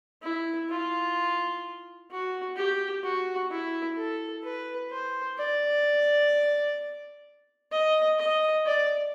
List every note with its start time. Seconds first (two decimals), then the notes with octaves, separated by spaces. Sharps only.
0.23 E4
0.69 F4
2.10 F#4
2.57 G4
3.04 F#4
3.51 E4
3.97 A4
4.43 B4
4.90 C5
5.38 D5
7.71 D#5
8.18 D#5
8.66 D5